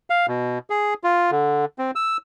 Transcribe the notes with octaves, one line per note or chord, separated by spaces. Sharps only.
F5
B2
G#4
F4
D3
C4
E6